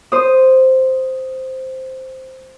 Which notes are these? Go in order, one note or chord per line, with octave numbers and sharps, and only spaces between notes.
C5 D#6